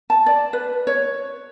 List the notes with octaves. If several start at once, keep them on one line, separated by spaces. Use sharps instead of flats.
A5
D5
B4
C#5